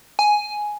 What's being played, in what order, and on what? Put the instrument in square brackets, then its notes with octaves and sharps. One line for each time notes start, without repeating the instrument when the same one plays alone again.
[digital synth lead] G#5